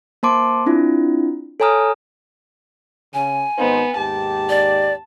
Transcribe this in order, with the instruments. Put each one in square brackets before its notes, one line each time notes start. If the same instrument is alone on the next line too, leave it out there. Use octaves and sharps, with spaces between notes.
[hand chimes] A#3 C5 A5 C6 D6
C4 D4 E4 F4
A4 C#5 G#5 A#5 D#6 F6
[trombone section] C#3 [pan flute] G#5
[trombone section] G#1 D#4 C5 [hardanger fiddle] B3
[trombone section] D#2 G#2 G4 [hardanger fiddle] A5
[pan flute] D5